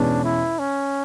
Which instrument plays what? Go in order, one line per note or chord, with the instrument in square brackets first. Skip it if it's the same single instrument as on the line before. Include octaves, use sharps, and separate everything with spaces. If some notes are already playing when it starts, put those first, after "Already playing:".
Already playing: [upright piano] E2 B2 G#3 C#4 [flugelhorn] D4
[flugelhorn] E4
C#4